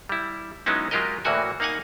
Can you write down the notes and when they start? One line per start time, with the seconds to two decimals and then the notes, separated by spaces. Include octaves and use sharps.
0.09 G3 E4
0.66 F#3 G#3 B3 C#4 D#4 E4
0.91 F#3 G#3 F4 G4 A#4 D#5
1.25 D2 A2 E3 A#3 F#4 G#5
1.60 A#3 D#4 F5 F#5 G#5